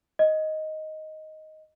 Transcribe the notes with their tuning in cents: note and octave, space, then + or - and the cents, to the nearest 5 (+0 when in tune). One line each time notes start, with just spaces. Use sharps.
D#5 +5